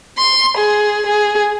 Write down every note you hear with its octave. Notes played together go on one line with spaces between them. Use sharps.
C6
G#4
G#4